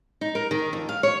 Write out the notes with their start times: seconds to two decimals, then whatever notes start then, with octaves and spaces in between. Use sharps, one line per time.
0.21 D#4
0.35 A#4
0.51 D#3
0.73 F2
0.89 F5
1.03 C#5